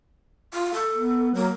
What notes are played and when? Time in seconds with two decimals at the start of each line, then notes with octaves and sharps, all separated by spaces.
0.53 F4
0.74 A4
0.95 B3
1.34 F#3 A#3